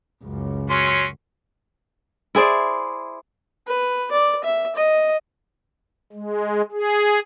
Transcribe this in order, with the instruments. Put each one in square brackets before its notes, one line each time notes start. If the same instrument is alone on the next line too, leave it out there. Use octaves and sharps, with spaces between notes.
[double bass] C#2 F#2
[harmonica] F#3 C#4 C6
[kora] E4 G#4 C5 D5
[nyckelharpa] B4
D5
E5
D#5
[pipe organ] G#3
G#4